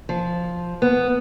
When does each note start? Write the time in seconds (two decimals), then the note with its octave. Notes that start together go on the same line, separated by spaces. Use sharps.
0.09 F3
0.82 B3